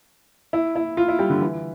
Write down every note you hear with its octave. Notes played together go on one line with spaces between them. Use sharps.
E4
E4
F4
E4
G3
D3
E3